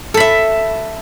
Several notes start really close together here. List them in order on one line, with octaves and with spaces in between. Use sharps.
A4 B5 E5